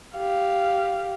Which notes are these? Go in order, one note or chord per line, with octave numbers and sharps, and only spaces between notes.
G4 F5